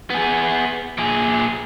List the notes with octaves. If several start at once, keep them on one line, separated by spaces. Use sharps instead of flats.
B3 G#4
A#2 G#4